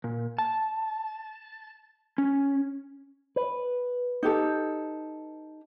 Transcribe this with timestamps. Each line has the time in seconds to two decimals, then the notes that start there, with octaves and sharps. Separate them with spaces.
0.04 A#2
0.39 A5
2.18 C#4
3.36 B4
4.23 D#4 G4 A4